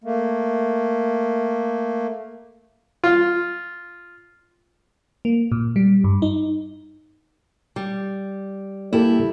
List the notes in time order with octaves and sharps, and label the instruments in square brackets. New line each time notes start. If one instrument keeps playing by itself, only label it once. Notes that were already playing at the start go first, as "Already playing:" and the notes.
[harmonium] A3 A#3
[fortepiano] F4
[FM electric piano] A#3
A#2
G3
G2
D#4
[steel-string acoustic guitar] G3
[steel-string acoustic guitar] G3 E4 [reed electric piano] A#3 G4 A4